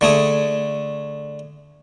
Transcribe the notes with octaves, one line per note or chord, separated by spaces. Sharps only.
D3 A3 G#4